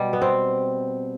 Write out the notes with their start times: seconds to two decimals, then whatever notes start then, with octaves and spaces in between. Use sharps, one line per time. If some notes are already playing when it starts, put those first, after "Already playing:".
Already playing: B2 G3
0.13 B3
0.22 C4